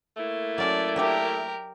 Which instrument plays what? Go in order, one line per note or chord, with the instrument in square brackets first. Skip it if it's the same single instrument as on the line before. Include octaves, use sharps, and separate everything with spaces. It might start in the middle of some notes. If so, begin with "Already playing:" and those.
[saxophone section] A3 A#3 E4
[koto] F#3 C#4 A4 [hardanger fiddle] D5
[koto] F#3 D4 E5 [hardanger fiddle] G4 A#4